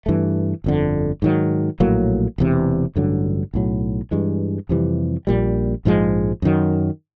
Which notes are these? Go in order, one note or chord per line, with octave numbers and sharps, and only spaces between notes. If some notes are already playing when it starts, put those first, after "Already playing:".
G2 E3 A3
G1 F2 D3
G#2 D#3 F#3
A#1 A2 F#3 A#3
E1 E2 C3
A1 G2 D3 F#3
B1 A2 F#3
G2 E3 G#3
F2 C3 E3 G3
A#1 A#2 G3
A#1 G#2 F3 G#3
F#2 D#3 F#3